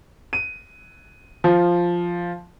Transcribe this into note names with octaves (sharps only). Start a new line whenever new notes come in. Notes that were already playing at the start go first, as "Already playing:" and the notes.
D#7
F3